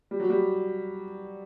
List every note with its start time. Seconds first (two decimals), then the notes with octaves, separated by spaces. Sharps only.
0.11 G3
0.20 F#3
0.30 G3